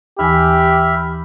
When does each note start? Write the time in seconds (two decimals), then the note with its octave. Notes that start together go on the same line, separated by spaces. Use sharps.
0.19 D#2 E3 G4 E5 G#5 B5 F6